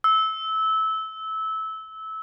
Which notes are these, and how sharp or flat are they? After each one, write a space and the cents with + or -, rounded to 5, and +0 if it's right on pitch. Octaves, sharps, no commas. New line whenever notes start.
E6 -20